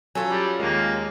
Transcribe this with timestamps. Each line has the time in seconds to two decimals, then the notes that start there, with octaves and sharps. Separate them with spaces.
0.15 F#3 C#4 F4 A4
0.29 G3
0.60 D#2 G#3 A#3